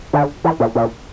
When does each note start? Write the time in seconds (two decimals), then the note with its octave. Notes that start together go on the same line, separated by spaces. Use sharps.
0.13 D3
0.44 E3
0.60 A#2
0.75 A#2